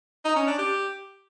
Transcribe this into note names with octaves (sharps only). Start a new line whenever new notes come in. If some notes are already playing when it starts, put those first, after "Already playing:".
D#4
C#4
D4
G4